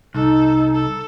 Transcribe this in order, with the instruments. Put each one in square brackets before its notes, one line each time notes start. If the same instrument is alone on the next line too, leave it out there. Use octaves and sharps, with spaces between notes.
[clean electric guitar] C2 [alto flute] D#4 [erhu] A4
[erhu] A4